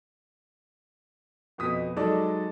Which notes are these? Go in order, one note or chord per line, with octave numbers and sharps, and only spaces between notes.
F2 B2 D#6 B6
F#3 G#3 D#4 A4 D5